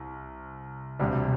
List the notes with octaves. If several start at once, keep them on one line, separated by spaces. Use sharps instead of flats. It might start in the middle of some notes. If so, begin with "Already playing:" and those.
Already playing: C2
E1 D2 C3 G3 D4